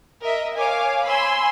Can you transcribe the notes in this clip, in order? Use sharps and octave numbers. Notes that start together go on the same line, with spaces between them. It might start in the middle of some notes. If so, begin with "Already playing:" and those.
A#4 D#5 E5
C#5 F5 G#5 D6
G#5 B5 C6 E6